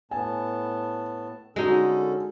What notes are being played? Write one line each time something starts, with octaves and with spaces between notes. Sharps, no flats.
A2 B3 G#5 A5
D3 G#3 C#4 D#4 F#4 A4